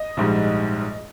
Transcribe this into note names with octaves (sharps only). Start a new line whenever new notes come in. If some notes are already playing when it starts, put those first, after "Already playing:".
Already playing: D#5
A#1 G#2 G3